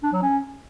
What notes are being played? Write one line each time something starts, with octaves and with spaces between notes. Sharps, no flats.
D4
F#3
C#4